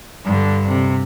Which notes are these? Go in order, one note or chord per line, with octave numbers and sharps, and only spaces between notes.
G2 D3
C3